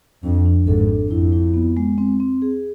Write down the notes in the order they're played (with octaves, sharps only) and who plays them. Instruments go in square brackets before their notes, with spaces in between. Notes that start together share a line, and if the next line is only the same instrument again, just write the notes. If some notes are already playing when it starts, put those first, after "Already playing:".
[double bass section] F2 [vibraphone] D4
[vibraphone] D4
[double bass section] G#1 G#2 [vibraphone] A4
[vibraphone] D4
[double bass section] F2 [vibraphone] E4
[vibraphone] E4
B3
G#3
C4
C4
G#4